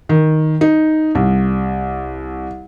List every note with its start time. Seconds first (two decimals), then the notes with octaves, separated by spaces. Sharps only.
0.09 D#3
0.61 D#4
1.15 C2